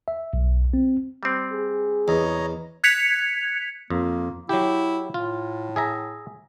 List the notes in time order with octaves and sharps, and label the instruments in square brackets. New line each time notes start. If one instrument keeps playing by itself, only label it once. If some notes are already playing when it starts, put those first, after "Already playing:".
[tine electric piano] E5
B1
C4
[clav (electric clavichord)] G3 C4
[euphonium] G#4
[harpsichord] E2 [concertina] C#5 D#5 A#5
[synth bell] F#6 G#6 B6 C#7 F7
[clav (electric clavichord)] F2 [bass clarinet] A#3
[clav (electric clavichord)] F#3 G4 [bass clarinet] E4
[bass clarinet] A2 [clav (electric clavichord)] F4
[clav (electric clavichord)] G#4 E5 A#5